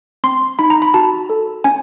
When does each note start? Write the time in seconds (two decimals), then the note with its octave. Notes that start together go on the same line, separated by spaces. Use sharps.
0.24 C4 C6
0.59 D#4 B5
0.70 A#5
0.82 B5
0.94 F#4 A5
1.30 A4
1.64 C#4 G#5